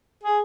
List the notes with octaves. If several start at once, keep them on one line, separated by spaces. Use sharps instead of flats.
G#4